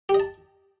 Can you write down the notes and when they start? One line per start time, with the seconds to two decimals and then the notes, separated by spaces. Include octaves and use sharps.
0.09 G4
0.14 D#5
0.20 A5